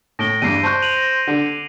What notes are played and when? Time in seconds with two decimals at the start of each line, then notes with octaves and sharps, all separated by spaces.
0.19 A2 A#6 D7 G7
0.42 E2 G2 C7 D#7
0.63 C5 A5 C#6 F#6
0.82 D#7 F7 F#7
0.97 A#6
1.27 D3